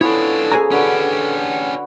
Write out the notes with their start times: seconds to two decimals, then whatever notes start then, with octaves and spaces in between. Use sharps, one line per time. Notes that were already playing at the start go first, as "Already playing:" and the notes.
0.01 F3 B3 C#4 D4 E4 A4 C#5
0.52 C#4 G#4 G#5 A#5
0.71 D3 C#4 F#4 G4 B4